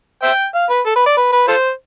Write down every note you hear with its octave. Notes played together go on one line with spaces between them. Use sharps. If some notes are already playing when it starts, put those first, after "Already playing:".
C5 E5 G5
F5
B4
A4
B4
D5
B4
B4
F4 A4 C5